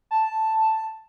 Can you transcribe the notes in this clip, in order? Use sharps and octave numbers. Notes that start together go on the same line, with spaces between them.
A5